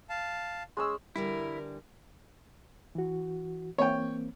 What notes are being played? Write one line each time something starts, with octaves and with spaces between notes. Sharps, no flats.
F5 A5
G#3 C#4 E6
D3 E3 G3 E4 A#4
E3 F#4
E3 A#3 C4 C#5 G5